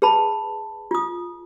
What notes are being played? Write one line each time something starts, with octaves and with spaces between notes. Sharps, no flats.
G#4 B4 A5 B5
F4 D#6